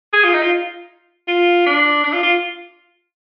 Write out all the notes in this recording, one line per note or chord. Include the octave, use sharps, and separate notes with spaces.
G#4
F4
D#4
F4
F4
D4
D4
F4
F4